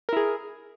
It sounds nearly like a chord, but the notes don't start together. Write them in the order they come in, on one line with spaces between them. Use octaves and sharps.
A#4 E4 G#4